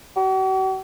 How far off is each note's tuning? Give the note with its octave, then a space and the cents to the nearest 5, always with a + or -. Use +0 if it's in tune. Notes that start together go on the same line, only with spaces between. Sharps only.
F#4 +45